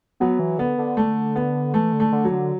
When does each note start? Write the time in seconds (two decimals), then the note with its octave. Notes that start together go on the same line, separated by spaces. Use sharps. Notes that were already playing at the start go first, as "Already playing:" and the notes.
0.20 F#3 B3
0.39 E3
0.58 D3 B3
0.78 D3
0.97 A3
1.36 B3
1.74 E3 A3
1.93 D3
2.00 A3
2.12 D3
2.25 F#3
2.31 D3